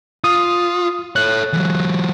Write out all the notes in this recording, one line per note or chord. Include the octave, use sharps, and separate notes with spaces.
F4 D#6
A4 C#5 F#6
E3 F#3